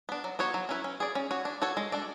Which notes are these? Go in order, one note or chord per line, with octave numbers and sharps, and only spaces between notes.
B3 D4
F#3
B3 F#4 C#5
F#3
C#4 E4 B4
C#4
G#4 D5
C#4
F#4 C#5
D4
F#4 A4 C#5
G#3
D4 A4 D5